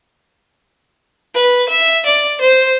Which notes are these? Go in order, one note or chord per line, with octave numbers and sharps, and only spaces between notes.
B4
E5
D5
C5